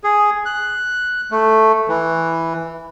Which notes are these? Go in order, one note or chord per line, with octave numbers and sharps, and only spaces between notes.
G#4
F#6
A3
E3